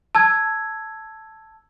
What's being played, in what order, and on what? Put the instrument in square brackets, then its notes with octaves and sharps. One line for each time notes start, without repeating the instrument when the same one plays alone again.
[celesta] A5 E6 G#6